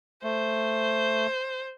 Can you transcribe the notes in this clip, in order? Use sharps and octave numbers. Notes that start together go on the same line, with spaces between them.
A3 C5